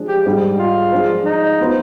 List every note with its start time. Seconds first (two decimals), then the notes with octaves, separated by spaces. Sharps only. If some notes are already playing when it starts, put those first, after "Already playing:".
Already playing: F3 G#3 D4
0.08 G4
0.26 G#2 G3 D4
0.59 F4
0.92 F3 G#3 D4
1.25 D#4
1.60 F3 B3 F4 C5